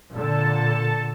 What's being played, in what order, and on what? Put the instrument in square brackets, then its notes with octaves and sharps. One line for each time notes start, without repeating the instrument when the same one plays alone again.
[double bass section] A#2 D3 [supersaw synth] A4 A5